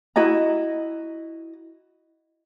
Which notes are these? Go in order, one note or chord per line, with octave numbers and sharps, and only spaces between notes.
E4 F#4 D#5 A#5